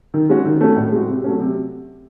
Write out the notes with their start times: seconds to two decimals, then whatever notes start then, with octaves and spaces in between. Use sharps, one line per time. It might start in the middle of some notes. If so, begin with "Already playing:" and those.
0.14 D#3
0.29 G#3 C#4 F#4
0.45 D#3
0.61 A3 C#4 F#4
0.76 A2
0.92 G#3 C4 F#4
1.08 C3
1.24 F#3 A3 C#4
1.40 C3